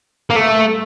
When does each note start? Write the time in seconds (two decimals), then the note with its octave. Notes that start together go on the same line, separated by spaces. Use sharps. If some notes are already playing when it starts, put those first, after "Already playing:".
0.30 A#3
0.36 A3